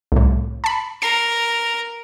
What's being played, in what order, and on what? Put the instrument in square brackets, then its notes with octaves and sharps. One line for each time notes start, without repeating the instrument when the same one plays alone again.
[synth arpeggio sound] C2 A2
A5 B5
[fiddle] A#4 [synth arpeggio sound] C7